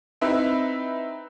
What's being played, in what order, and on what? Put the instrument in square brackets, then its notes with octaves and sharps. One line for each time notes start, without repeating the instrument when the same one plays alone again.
[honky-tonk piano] C4 D#4 E4 B4 E5